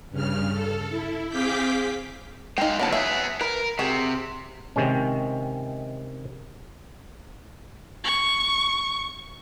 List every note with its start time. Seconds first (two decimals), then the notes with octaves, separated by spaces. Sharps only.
0.11 G2 C#3 F6
0.52 A4
0.90 E4
1.29 C4 G#4 F5 D6 G6 B6
2.58 G#3 D#4 F5 G5
2.79 D2 A#2 B3 C#4 A5
2.93 F#3 B3 G#4 E5
3.41 A#4 B4
3.79 C3 F#4 G#4
4.76 C3 D#3 G#3 C#4
8.04 C#6